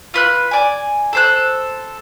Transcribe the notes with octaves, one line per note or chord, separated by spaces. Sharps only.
F4 B4 F#6
D5 G#5
A4 C5 F#6